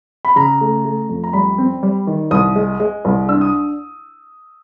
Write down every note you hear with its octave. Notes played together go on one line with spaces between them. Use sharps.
B5
C#3 A#5
A3
A3
F2
A#5
G3 B5
C4
G3
D#3
C2 D#6
G#3
G#3
C2
D4 E6
D#6